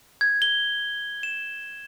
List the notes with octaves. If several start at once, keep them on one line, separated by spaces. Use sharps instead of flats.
G#6
G7
E7